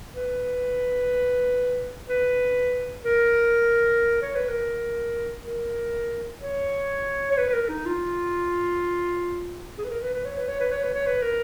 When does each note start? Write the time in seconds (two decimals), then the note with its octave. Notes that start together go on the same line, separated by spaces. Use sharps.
0.16 B4
2.09 B4
3.05 A#4
4.22 C#5
4.35 B4
4.48 A#4
5.45 A#4
6.41 C#5
7.31 C#5
7.38 B4
7.49 B4
7.53 A#4
7.69 D#4
7.86 F4
9.78 G#4
9.85 B4
9.90 A#4
10.02 B4
10.14 B4
10.25 C#5
10.37 B4
10.48 C#5
10.60 B4
10.71 C#5
10.83 B4
10.94 C#5
11.06 B4
11.22 A#4